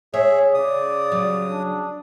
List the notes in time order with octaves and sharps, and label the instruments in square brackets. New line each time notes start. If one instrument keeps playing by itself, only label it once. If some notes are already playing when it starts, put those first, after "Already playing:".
[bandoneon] G#4 E5 [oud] C#5
[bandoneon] C#3 D#6 [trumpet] D5
[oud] F#3
[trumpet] D4